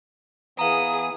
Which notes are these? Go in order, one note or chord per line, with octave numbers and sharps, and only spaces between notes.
E3 B3 G#4 F5 A#5 D#6